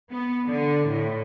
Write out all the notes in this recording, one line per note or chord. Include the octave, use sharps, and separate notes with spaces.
B3
D3
A2